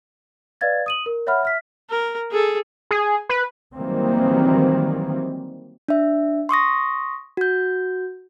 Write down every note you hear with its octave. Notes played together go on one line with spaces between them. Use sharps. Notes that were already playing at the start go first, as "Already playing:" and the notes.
B4 D5 D#5 F5 G#6 A6
D#6 D#7 F#7
A#4
C#5 E5 F#5 B5 F6
E5 F6 B6
A#4
G#4 A4
G#4
B4
D#3 E3 F#3 G3 A#3 C4
D4 E5
C6 C#6 D#6 A#6
F#4 G6